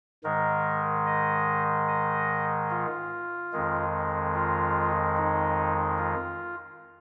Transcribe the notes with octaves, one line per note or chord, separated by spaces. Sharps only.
G#2 D#3 G#3 A#4
D#5
D#5
F4
F2 D#3 G#3
F4
D#4
F4